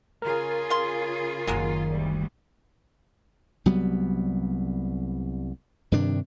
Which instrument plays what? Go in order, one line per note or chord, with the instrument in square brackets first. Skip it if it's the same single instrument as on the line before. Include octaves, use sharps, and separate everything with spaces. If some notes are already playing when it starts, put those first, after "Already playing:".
[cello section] C#3 F4 G#4 [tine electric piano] A#4
[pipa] F5 C6
[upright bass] F#1 D#3 [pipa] F#3 G#3 A#3
[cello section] D2 G3
[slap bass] C2 F#3 G3 B3
G2 C3 D#3 D4